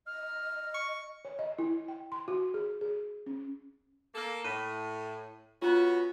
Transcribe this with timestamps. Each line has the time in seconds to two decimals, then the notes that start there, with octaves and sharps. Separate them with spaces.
0.07 D#5 F6
0.74 C#6
1.25 C#5
1.39 D#5
1.58 E4
1.88 G5
2.12 C6
2.28 F#4
2.54 G#4
2.81 G#4
3.26 C#4
4.15 A#3 A4
4.44 A2 D#7
5.62 B3 C#4 F4 F#4